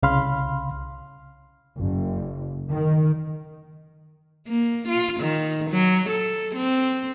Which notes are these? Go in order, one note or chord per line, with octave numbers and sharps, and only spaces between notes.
C2 C#3 F5 B5 C6 F6
F#1
D#3
A#3
F4
D#3
F#3
A4
C4